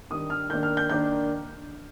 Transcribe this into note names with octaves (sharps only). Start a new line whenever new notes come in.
D#3 G3 D4 D#6
F6
D#3 A#3 D4 G6
F6
G6
D#3 A#3 D4 G6